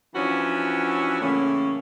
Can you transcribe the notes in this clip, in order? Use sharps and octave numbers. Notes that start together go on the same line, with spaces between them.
E3 F3 C#4 D4 F#4
A2 C#3 E3 A#3 C#4